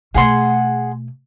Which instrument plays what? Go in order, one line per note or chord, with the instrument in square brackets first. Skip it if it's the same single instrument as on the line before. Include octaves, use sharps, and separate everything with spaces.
[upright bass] B2 A3 [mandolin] G#4 F#5 C6